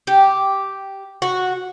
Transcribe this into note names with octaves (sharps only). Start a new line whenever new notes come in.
G4
F#4